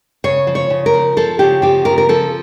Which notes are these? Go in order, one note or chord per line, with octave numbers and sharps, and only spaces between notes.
C#3 C#5
F3
C#5
C#3
A#4
F3
F3 A4
C#3 G4
F3 G4
C#3 A#4
A#4
F3 A4